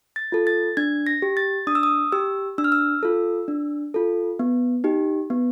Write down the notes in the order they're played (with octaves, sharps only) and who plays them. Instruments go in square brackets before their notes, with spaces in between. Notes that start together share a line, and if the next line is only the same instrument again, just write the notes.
[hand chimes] A6
F4 A4
A6
D4 G#6
A#6
G4
A6
D4 D#6
E6
D#6
G4 E6
D4 E6
F6
E6
F4 A4
D4
F4 A4
B3
D#4 G4
B3